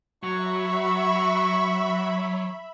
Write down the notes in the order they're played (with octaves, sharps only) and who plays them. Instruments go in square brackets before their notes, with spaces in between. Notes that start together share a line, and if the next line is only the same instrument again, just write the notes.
[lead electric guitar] F#3 [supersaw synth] E5 B5 [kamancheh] C#6